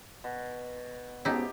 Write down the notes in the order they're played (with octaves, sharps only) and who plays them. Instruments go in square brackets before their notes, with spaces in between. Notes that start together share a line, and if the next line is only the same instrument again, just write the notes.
[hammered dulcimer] B2
[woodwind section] G#2 B3 [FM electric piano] C#4 F#4 A5 [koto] D#4 E4 [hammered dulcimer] G4